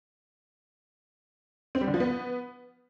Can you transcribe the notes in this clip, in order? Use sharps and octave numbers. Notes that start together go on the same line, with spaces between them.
C4
G3
D3
F3
B3